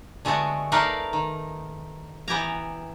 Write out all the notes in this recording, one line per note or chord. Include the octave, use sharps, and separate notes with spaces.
D3 G#3 A3 B3 F#4 G4
A3 D#4 A#4 B4 D5 F5
D#3
E3 B3 G4 G#5 A#5